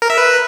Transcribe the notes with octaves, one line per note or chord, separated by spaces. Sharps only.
A#4
E5
B4